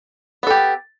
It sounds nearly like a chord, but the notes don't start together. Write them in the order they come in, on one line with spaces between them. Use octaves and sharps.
B3 A4 G4